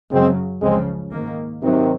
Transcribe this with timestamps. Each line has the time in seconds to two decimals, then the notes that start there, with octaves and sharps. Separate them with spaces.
0.11 F#2 C#3 F#3 G#3 C4
0.62 C#2 C#3 F3 G#3 C4
1.11 G#2 D#3 A#3
1.62 G#2 C3 D#3 F#3 C4